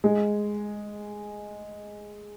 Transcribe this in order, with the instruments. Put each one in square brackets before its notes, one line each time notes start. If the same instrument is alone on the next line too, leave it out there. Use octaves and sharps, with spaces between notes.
[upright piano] G#3